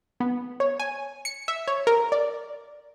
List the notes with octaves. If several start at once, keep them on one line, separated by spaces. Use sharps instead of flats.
B3
C#5
G#5
C#7
E5
C#5
A#4
D5